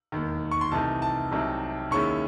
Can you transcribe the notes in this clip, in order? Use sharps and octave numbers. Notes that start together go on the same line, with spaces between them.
E1 D#2 D#3
C#6
C6
C2 C3 E3 A3 D#4 A5
A5
C2 C3 F#3 A3 D#4
D#2 D#3 G#3 C#4 E4 C#6